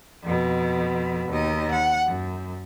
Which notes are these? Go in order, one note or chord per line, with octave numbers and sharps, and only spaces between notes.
F2 B2
D#2 D#5
F#5
F#2